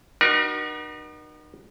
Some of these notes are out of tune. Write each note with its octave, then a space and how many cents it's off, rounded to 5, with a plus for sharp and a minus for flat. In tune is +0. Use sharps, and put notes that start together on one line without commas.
D#4 -40 F#4 +20 A#4 +40